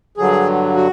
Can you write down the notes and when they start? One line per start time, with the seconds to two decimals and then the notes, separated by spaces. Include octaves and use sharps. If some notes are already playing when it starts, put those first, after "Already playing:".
0.17 G2 D3 F#3 G#4
0.76 F#4